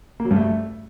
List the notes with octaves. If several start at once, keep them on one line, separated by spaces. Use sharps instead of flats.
A#3
F#3
G2
A3